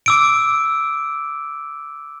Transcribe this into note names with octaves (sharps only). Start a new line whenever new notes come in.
D6 E6 D7